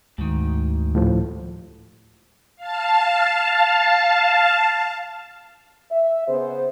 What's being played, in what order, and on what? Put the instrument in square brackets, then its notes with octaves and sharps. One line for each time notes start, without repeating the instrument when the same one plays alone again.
[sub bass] D2 [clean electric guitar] G#2 D#3
[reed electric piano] A2 F3
[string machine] F5 A5
[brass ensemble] E5
C#3 B3 G#4 C5